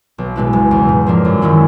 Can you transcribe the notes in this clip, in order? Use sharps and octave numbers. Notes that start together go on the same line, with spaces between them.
B1
B2 G#3 B3 E4
F#1
E2 C#3
G#2
F3 A#3 D4
F#2
D#3 G#3 C#4 E4